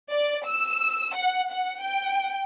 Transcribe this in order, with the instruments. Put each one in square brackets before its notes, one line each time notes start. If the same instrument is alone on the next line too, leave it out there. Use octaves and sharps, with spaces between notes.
[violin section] D5
E6
F#5
F#5
G5